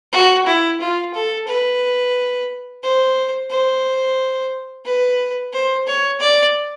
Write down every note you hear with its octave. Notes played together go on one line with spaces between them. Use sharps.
F#4
E4
F4
A4
B4
C5
C5
B4
C5
C#5
D5